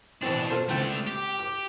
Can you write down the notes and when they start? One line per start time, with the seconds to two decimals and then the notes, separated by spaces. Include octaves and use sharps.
0.22 A1 B2 E3 C4 D4
0.50 F4 A4 C5
0.69 C#2 A3 C4 D4 G5
1.07 G4
1.39 D6